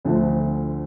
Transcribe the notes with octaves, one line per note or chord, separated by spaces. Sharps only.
D2 D3 F3 A3